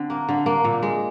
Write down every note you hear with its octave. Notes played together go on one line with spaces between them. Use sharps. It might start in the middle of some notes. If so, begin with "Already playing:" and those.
Already playing: D3 C4
A#3
D3
A#3
A#2
G#3